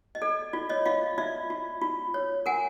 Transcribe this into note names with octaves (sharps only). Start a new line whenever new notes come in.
D#5
A4 D5
F4 D5
C#5 D#5
F4 D#5 F5
F4 D5 E5
F4
F4
C#5
A#4 F#5 G#5